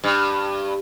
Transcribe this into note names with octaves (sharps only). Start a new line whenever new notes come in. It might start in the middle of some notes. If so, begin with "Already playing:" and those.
G2